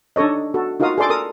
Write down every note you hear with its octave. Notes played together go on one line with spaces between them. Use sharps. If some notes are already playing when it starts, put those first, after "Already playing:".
D4 D#4 A4 C#5 D#5
F#4 A4
D#4 F4 F#4 A#4 F5 D#6
G#4 A4 D5 C6 D6
A4 A#4 D#6